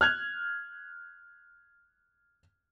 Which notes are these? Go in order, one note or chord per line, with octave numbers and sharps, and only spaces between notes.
F6 F#6 G#6 F7